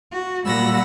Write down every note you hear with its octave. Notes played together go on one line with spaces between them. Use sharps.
F#4
A#2 G3 F#5 B5 E6 A#6